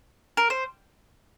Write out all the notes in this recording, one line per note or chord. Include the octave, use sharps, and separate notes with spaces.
A#4
C5